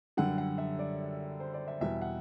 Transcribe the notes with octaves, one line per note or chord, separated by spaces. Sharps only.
F#2 D3 G3 F#5
F#5
E5
D5
C5
D5
E5
E2 B2 G3 E5
F#5